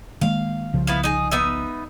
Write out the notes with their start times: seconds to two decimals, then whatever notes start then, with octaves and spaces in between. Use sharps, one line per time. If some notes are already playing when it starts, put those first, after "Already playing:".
0.21 D#3 G#3 A#3 F5
0.73 C2 C#3 F3
0.87 B3 E4 F5
1.03 D#4 G#4
1.31 B3 D#4 E5